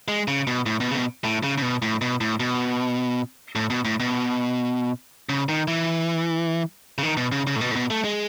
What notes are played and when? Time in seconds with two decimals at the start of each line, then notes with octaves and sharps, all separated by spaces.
0.08 G#3
0.28 C#3
0.47 B2
0.66 A2
0.80 B2
0.91 C#3
0.94 B2
1.24 A2
1.43 C#3
1.58 C#3
1.62 B2
1.82 A2
2.01 B2
2.21 A2
2.40 B2
3.55 A2
3.70 B2
3.85 A2
4.00 B2
5.29 C#3
5.49 D#3
5.68 E3
6.98 C#3
7.03 D#3
7.17 B2
7.32 C#3
7.47 C#3
7.56 A2
7.61 B2
7.71 A2
7.76 B2
7.90 A3
8.04 G#3